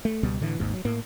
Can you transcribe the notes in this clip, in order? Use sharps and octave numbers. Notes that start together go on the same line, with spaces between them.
A3
C#2 B2 G3 B3
A2 D3 E3
G#1 D#2 G#2
F#3
A2 A#3